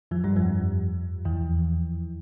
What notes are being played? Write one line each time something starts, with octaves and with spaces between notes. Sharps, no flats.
F2 F3
G2 G3
F2 F3
E2 E3